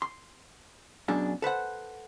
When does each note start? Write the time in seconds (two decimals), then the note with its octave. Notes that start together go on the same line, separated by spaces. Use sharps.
0.02 C6
1.08 F#2 B2 D4 G#4
1.42 A4 B4 C5 F#5